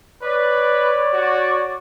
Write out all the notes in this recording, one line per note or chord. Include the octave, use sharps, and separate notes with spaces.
B4 C#5 D5
F#4